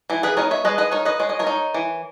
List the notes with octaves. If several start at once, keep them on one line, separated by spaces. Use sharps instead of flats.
E3 E4
G#4 B4
B3 D#4 A#4 C#5
C#5 E5
G#3 B4 D#5
B4 D#5
D#4 A#4 C#5
B4 D#5
G#3 C#5
D#5
A#4 C#5
D#4
E3